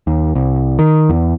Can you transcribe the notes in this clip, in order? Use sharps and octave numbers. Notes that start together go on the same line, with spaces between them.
D#2
C2
D#3
E2